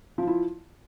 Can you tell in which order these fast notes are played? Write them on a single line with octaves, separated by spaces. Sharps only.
F3 F4 E4